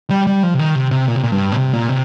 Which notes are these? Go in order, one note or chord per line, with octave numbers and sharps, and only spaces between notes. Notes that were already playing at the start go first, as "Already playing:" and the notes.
G3
G3
F3
C3
D#3
C3
C3
A#2
C3
A#2
G2
A#2
C3
A#2
C3